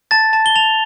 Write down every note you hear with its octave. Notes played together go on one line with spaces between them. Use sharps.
A5 A6
A5
G7
A5 F7